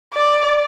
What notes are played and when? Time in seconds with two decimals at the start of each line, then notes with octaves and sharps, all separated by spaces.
0.14 D5